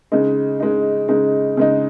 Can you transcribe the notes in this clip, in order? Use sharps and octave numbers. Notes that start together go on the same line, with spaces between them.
C#3 G#3 D#4
C#3 G#3 D#4
C#3 G#3 D#4
C#3 G#3 D#4